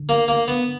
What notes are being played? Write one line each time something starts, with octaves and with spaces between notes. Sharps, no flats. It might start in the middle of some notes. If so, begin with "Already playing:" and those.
Already playing: D3
A#3
A#3
B3